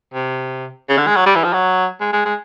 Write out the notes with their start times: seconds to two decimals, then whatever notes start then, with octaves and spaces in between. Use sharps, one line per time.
0.14 C3
0.89 C#3
0.98 D3
1.07 G#3
1.16 F#3
1.26 G3
1.36 E3
1.44 F3
1.53 F#3
2.01 G#3
2.13 G#3
2.25 G#3